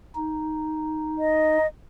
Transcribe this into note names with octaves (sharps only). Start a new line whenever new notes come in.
D#4
D#5